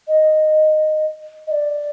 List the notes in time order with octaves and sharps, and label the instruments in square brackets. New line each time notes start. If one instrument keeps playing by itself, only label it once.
[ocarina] D#5
D#5
D5